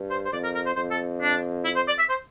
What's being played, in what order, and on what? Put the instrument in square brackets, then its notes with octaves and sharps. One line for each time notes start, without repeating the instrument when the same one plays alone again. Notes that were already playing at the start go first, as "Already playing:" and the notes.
Already playing: [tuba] G2
[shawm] C5
C5
[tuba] F2 [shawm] D5
[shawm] A#4
A#4
C5
[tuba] F2 [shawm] C5
[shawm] A4
D4
E4
C5
D5
E5
C5